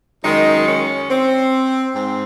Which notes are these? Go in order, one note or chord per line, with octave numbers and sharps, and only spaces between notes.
F#2 D#3 G#3 D#4
C#4
C4
G#2 C4